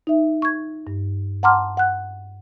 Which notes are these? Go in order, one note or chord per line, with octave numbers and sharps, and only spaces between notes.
D#4 E5
C#6 G#6
G2
F#5 A5 A#5 C6 D6 F6
F#5 F#6